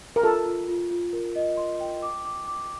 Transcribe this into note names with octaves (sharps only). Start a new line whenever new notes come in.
A#4
F4 A4
F4
F4
F4
A#4
D#5
C6
G5
D6
D6
D6